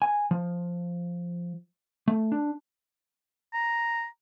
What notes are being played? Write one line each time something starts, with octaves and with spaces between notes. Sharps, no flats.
G#5
F3
A3
D4
A#5